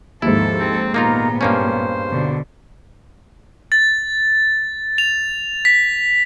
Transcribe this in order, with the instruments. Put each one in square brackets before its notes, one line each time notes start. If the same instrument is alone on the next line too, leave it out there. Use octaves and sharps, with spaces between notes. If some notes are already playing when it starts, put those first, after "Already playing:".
[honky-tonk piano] D#2 G#2 [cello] F3 A4 [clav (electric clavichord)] E4
[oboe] C4
[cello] A#2 B3 [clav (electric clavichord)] A#3 D#4 F4 [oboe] A#5
[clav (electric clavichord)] G2 A#3 C#4 [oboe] C5
[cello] B2 D3
[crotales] A6
F7
B6